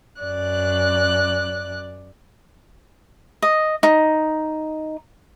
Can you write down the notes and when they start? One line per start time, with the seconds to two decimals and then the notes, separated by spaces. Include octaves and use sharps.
0.22 F#2 D5 F#6
3.42 D#5
3.83 D#4